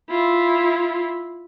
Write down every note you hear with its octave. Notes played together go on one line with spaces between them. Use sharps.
E4 F4